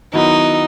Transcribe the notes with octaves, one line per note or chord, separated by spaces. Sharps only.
D#3 F#3 B3 D#4 E4